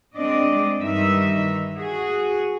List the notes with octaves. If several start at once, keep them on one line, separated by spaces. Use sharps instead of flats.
G#3 C4 D4 D5 D#5
G2 D#3 E3 D#4 E5
F#4 G#4